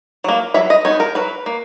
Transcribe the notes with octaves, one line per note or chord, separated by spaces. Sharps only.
F#3 A#3
F#3 E5
D#5
B3 D#4 C#5
A#4
F#3 B4
A#3